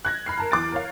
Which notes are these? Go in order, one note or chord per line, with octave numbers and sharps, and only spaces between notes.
F#6 G#6 A#6
B5 F6 C7
A#4 A5 A#5
E2 E3 D6 F#6 A6 D7
A#4 C#5 F5